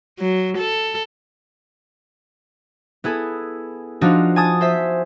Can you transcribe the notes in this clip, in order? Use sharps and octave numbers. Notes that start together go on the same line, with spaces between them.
F#3
A4
B3 E4 G#4 A4
F3 D4 D#4 F4 F#4
G#5 A5 D#6 A6
C5 E5 B6